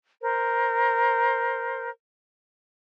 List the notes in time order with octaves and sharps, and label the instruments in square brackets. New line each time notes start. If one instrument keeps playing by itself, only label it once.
[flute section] A#4 C5